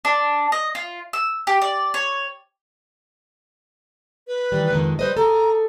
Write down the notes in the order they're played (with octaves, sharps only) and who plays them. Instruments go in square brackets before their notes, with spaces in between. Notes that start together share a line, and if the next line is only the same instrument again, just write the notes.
[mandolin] D4
D#5
F4
E6
G4
D5
C#5
[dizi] B4
[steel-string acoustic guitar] D#3 E3 G3
F2 D#3 G#3
[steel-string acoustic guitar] G3 B4 D#5 [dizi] C5
[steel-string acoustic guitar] G#4 A4 [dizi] A#5